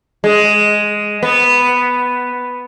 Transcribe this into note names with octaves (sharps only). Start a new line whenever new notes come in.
G#3
B3